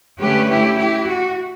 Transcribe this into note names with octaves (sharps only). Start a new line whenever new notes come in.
D3 A3 C#4 G4 B4
E4 G4
E4 G4
F#4